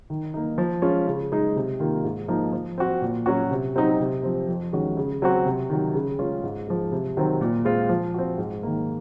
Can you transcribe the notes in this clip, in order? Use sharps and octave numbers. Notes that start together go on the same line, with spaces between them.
D#3
A#3 D#4
F3
G#3 C#4 F4
C#3
G#3 D#4
C3
D#3 A#3 F4
G#2
F3 A#3 D#4
F3
C4 F#4
A#2
F#3 C#4 F#4
C3
F#3 C4 D#4 F#4
C3
F3 C4
F2
D#3 G#3 C#4 F#4
C#3
F#3 C4 F#4
C3
D#3 F#3
C#3
G#3 C#4 F4
G#2
F3 G#3
C3
D#3 F#3 C4
A#2
G#3 C4 F4
F3
C4 F#4
G#2
D#3 A#3